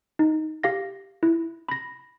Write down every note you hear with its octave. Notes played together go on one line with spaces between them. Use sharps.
D#4
G4 F5 A#6
E4
B5 A#6